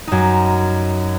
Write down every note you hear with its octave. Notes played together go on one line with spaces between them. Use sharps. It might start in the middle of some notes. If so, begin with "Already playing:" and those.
F#2 D#4